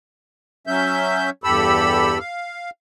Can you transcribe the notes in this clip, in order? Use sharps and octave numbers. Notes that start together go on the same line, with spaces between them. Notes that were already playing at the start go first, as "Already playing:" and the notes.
F#3 C#4 E5 G6
E2 G2 G4 A4 B5 E6
F5